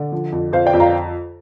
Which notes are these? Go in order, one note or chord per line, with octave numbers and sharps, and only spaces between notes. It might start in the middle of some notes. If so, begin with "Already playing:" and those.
Already playing: D3 D5
F3
F2
F2 C5 F5
D5 G5
F2
F5 A#5